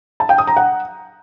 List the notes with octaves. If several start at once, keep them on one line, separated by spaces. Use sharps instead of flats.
A5
G5
D#6
A#5
F#5